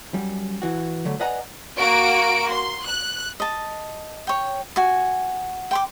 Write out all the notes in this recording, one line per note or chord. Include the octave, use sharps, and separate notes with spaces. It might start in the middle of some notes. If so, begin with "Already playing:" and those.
F#2 G3
E3 F#4
D3 F#3 A3
B4 D5 D#5 F#5 G#5 A#5
A#3 F#4 A#4 D7
C6
F#6
D#5 A5
C#5 G5
F#4 G#5
G5 C6 D6